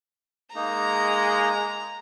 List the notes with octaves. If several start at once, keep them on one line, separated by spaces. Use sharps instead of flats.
G#3 A#3 D#4 A#5